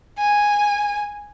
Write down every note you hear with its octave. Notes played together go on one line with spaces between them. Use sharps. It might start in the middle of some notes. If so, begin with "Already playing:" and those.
G#5